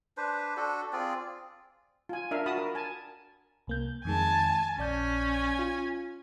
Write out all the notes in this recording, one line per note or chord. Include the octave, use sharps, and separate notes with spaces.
D4 B4 C5
D4 F#4 A4
C4 F4 G#4 D5
F4 G#5
D4 A#4 E5 F5
F#4 A5 B5 D#6
A#4
G#5 A5
C2 A#3 G6
F2 D#3 G#3 G#5 A5
A#1 C#4 D5 G#5 G6
F4